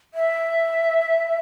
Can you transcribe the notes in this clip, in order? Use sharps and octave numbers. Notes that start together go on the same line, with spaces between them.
E5